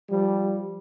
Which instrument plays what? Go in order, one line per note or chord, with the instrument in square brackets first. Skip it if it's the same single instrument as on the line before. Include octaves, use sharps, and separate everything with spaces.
[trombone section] F3 G3